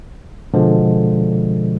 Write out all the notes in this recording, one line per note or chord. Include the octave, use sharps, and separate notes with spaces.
B2 D3 F3 G#3